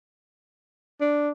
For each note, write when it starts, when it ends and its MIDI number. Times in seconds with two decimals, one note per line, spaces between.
1.01 1.31 62